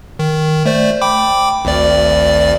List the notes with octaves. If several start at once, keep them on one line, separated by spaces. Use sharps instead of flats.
D#3
A3 C5 D5
G5 B5 D6
G#1 D2 D5